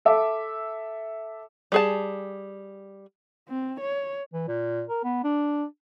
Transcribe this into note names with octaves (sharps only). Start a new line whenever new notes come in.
A4 E5 D6
G3 G#4 A5
C4
C#5
E3
A#2
A#4
B3
D4